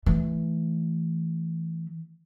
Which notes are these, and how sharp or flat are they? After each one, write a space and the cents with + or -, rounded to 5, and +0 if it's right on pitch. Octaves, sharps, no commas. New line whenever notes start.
E3 +0 A3 +0